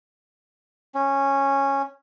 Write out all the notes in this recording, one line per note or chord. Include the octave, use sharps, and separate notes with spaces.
C#4